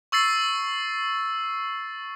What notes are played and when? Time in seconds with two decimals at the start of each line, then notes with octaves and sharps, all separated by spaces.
0.12 C#6 E6 A6 C7